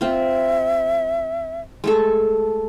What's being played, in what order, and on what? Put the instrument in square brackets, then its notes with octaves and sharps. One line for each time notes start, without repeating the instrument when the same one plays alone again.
[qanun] C4 F4 [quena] E5
[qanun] G#3 A3 A4